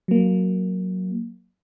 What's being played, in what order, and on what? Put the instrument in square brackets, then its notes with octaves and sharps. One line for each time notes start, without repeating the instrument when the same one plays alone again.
[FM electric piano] F#3 A#3